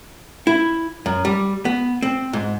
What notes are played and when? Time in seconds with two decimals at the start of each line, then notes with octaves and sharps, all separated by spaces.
0.47 E4
1.06 F#2
1.25 G3
1.65 B3
2.02 C4
2.33 G#2